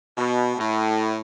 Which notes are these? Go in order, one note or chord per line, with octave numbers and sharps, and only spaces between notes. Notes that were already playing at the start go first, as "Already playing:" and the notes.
B2
A2